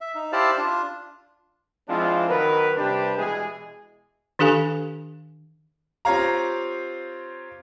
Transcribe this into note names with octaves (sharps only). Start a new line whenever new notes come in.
E5
D#4
E4 G4 C5 D5 F5 A5
D4 F4
F3 G#3 C4 D4 E4 F4
D#3 F#3 A#4 B4
C3 G3 D4 G4 B4
B2 E3 G#3 G#4
D#3 D4 G4 A4 F5 G#5
C4 F4 G4 C#5 F5 A#5